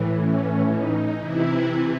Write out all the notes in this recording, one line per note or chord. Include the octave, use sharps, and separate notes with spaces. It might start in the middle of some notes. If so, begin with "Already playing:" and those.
Already playing: A2 E3
C#4
D#4
C3 E3 E4